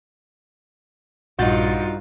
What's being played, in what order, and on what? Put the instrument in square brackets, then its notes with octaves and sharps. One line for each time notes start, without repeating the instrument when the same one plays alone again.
[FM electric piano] A#1 G6 A6 [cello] G2 F4 [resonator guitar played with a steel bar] D#4 F#4